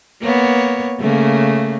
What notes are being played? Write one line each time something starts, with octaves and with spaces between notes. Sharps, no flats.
A#3 B3 C#5
C#3 A3 A#3